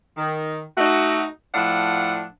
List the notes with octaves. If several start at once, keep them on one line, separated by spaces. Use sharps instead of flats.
D#3
A3 D#4 F#4
A2 F3 D4 F5 F#5